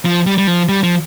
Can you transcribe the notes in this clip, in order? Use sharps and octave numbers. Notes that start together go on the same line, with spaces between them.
F3
G3
G3
F3
G3
F3